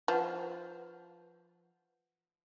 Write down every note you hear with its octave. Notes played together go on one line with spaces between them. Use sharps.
F3 B4 F#5